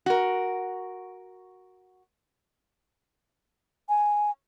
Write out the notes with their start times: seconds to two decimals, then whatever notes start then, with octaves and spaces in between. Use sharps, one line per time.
0.06 F#4 A#4
3.89 G#5